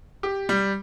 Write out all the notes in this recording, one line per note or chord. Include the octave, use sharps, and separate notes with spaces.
G4
G3